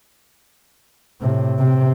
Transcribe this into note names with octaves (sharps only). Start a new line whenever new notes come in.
A2 C3
C3